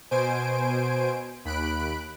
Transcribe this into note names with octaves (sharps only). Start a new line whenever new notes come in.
B2 C5 G#5 D7
D#2 B5 F#6 D7